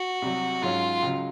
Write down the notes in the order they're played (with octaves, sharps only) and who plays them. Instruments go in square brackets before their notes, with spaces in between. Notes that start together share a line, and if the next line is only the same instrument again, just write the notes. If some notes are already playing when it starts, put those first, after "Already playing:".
Already playing: [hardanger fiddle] F#4
[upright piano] C2 C3 F#3
[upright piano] G#2 F#3 C#4 [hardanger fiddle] F4
[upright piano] C#2 C#3 F#3